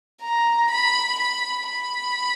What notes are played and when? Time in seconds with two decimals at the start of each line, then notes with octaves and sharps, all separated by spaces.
0.22 A#5
0.70 B5
1.19 B5
1.69 B5